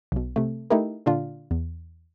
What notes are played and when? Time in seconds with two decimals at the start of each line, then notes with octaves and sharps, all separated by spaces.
0.12 B1 B2
0.36 C3 A3
0.70 A3 D#4 E4 G4 A#4
1.06 A#2 D3 D4 F4
1.51 E2